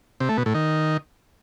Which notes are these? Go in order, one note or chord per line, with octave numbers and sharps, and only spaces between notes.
C3
A3
B2
A2
D#3